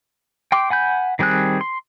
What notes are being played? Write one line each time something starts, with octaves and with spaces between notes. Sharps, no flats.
G5 C6 D6
F#5 G#5 B5 G6
D#3 G3 C4 G#4 F#6
C6